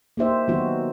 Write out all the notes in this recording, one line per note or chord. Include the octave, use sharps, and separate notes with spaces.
A#3 D#4 G4 C5 E5
D#3 F#3 B3 D#4 F#4